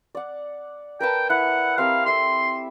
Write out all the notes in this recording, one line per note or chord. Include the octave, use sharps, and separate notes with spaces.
D5 F#5
A#4 B4 G5 A5
E4 F#5
C4 G4 A#4 F5
A4 E5 C6